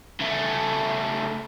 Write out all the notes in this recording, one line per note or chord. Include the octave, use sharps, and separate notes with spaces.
C#3 A3